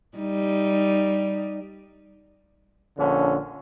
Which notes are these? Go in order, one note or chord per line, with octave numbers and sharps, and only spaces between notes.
G3 D#4
A#1 D3 C#4